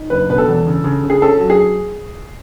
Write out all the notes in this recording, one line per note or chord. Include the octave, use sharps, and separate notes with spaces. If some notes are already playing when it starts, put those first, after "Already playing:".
Already playing: D#4
F#1 B4
B2 B4
A4
E2
C#3
C#3
C#3
G#4
C#4 A4
F#3
G#4